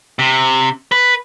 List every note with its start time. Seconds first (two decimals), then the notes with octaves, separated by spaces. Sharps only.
0.19 C3
0.92 B4